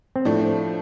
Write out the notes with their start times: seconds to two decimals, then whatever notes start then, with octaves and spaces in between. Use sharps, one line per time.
0.16 C4
0.25 A2 F3 A3 D4